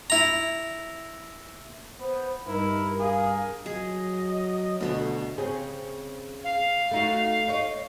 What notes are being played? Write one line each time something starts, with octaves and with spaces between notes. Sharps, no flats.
E4 A#5
B3 C5
G2 D#4 E4 A#4
G#4 F5
F#3 G#4 D#5
D2 B2 B3
C#3 C4 G#4
F5
A3 D#4 F#4
D#4 C#5